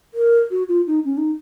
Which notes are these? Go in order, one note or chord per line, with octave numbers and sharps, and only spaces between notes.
A#4
F#4
F4
D#4
C#4
D#4